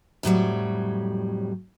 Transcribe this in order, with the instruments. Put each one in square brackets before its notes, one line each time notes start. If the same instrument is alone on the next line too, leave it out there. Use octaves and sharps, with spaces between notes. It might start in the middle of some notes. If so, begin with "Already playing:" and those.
[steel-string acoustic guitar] F2 A2 F#3 G3